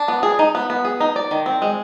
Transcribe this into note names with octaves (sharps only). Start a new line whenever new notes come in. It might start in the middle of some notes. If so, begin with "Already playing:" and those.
Already playing: D4
B3
G#4
D#4
B3
B3
G#4
D#4
D5
D#3
C4
G#3